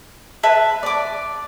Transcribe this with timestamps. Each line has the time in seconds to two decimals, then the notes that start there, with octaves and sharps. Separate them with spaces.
0.43 B4 E5 A5
0.83 D5 D6